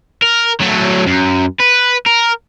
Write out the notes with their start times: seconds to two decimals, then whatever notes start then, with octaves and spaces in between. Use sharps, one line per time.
0.22 A#4
0.61 F#3 A3
1.06 F#2
1.60 B4
2.06 A#4